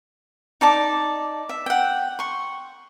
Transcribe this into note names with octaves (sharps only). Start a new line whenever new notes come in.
D#4 D5 A5 D6
E5
F#5 G5
C6 C#6